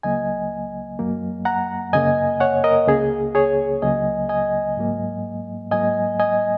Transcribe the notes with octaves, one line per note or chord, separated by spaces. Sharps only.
C#2 C#3 F#3 A#3 D#5 G#5
F#2 F#3 A#3
F#5 A#5
F#2 C#3 A#3 D#5 G#5
C#5 F#5
A#4 D#5
C#2 C#3 A#3 G#4
G#4 C#5
C#2 C#3 F#3 A#3 D#5 G#5
D#5 G#5
G#2 F#3 A#3
G#2 F#3 A#3 D#5 G#5
D#5 G#5